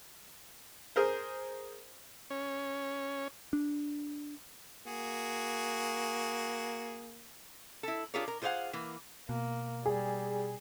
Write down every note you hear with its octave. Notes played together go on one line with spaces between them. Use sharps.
G#4 A#4 C5
C#4
D4
A#3 F#4 G#4
E4 A4
D4 F4 G4 G#4 A#4 C#5
A#4
F4 G#4 C5 D5 F5 F#5
E3 A#3
B2 A#3
G3 G#4